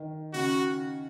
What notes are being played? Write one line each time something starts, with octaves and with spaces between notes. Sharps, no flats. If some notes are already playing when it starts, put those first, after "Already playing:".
Already playing: D#3
C#3 F#4